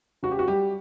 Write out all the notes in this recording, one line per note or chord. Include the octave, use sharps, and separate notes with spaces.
C#3 F#4
G4
F#4
G3 G4